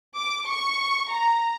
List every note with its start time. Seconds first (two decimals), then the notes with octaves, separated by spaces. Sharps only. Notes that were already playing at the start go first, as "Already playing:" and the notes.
0.16 D6
0.47 C#6
1.10 A#5